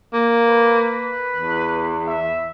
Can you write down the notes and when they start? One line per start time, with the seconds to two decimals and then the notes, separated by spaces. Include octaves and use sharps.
0.14 A#3
0.49 B4
1.37 E2
2.07 E5